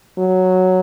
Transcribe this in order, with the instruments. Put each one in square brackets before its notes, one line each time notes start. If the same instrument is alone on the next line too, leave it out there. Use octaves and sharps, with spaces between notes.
[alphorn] F#3